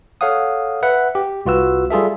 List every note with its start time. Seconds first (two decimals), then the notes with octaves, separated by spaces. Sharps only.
0.21 A4 C#5 F5 F#5 D#6
0.83 B4 E5 F#5
1.15 G4
1.46 C2 F4 F#4 B4 E6
1.91 G3 F4 G#4 A4 E5